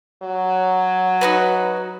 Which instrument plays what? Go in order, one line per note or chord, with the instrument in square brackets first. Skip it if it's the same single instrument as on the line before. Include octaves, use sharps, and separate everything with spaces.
[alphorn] F#3
[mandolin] D#4 F#4 B4